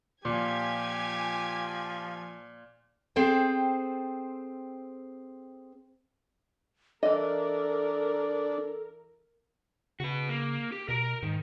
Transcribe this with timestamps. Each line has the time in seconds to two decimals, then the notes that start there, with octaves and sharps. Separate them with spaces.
0.25 A#2 F3 G4 G#5 G#6
3.16 C4 G#4 A4 C5 G5
7.03 E3 D4 A4 A#4 D#5
10.00 C#3 F#4 B4
10.29 A#3
10.72 G4
10.89 B2 A#4 A#5
11.23 G#2 D#3